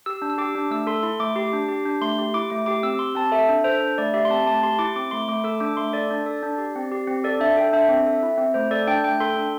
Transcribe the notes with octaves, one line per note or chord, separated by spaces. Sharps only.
G4 E6
D4
E6
G4 D6
D4
A3 E6
A4 C6
E4 C6
A3 D6
G4
D4
G4
D4
A3 C6
G4
E4 D6
A3 D6
G4 D6
C4 E6
G4 C6
C4 A5
A4 E5
D4
A4 C5
D4
A3 D5
G4 E5
C6
C4 A5
A3 A5
G4 C6
E4 D6
C4 D6
A3 C6
A3 D6
A4 E6
D4 D6
A3 C6
A4 D5
D4
A4
D4
G4
C4
G4
C4
A4 D5
D4 E5
A4 G5
D4 E5
C4
A4
E4
C4
A3 C5
A4 D5
D4 G5
A3 G5
A4 C6
D4